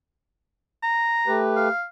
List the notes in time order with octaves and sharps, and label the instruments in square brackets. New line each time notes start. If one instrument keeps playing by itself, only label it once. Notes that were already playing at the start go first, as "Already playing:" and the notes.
[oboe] A#5
[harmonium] A3 G4 B4
[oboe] F5